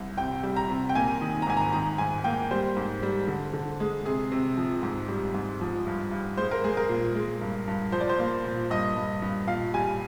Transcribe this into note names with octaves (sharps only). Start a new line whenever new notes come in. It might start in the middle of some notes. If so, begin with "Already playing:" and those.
Already playing: C2
C3 G5
G3
A#5
C3
G5
A#3 G#5
D#3
A#5
G#2 G#5
A#5
D#3 A#5
G#2 G#5
A#3 G5
G3 C5
G#2
G3
D3
D3
G#3
C3 G#4
C3
F3
G#2
G3
G#2
F3
G2
G2
G#3 C5
A#4
G#3 G#4
A#4
A#2
G#3
G2
G2
F3 C5
D5
C5
A#3
A#2
G2 D#5
G2
G2
A#2 F5
G3 G#5